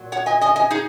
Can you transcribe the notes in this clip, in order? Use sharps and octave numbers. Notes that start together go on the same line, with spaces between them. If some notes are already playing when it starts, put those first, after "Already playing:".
Already playing: A#2 F#3
C#5 F#5
D#5 G#5
D#5 G#5
D#5 G#5
D#4 G#4